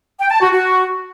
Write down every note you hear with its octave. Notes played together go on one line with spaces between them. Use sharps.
G5
A5
F#4
F#4